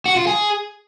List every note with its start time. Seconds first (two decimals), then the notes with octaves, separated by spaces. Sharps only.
0.06 F#4
0.16 F4
0.27 G#4